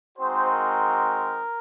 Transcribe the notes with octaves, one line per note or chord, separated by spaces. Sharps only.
G#3 C4 D#4 F#4 C5
A#4